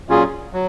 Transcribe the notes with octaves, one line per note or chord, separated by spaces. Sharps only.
A#2 F#3 C#4 F4 G#4
F#3